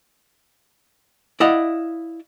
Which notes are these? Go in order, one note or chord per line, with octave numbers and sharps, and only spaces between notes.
E4 D5 D#5 F5 F#5